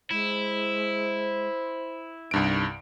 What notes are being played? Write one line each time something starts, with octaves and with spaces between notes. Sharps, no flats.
G#3 E4 C5
C2 G2 G3 B3 D#4 D7